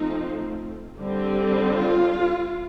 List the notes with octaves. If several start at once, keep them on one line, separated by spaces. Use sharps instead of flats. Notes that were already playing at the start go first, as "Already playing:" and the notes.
Already playing: F3 A3 C4 D#4
D3 G3 C4
F4